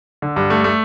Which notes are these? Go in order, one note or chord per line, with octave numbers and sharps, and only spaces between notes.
D3
G2
A3
A3